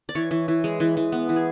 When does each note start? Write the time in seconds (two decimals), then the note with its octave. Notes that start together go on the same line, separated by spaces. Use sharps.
0.09 D5
0.15 E3 C#5
0.31 E3
0.48 E3
0.64 G#3
0.80 E3
0.97 E3
1.12 B3
1.29 E3
1.36 G#4